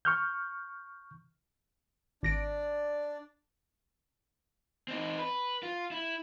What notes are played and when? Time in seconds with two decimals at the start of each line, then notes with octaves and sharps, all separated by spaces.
0.05 C#6 F6 G6
2.23 G#1 D4 D5 A#6 D7
4.88 C4 D#4
5.19 B4
5.63 F4
5.91 E4